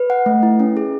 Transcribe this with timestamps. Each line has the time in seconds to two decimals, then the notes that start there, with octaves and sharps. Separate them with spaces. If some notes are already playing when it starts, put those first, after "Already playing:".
Already playing: B4
0.10 F#5
0.26 A3
0.43 E4
0.60 C#4
0.77 G#4